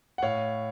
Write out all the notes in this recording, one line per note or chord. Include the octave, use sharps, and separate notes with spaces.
F#5
A2 C#5 F5